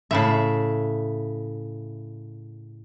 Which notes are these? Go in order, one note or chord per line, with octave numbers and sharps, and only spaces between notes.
A2 C#3 E5